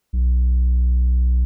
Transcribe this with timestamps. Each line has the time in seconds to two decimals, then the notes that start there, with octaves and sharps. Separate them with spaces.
0.13 B1